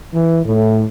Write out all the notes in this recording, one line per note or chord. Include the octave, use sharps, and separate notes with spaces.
E3
A2